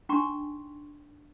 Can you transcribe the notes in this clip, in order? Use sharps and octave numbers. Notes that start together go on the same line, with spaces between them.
D4 D#4 G5 A#5 C6 C#6